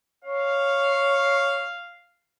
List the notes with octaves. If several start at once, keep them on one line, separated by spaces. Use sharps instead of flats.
C#5 F5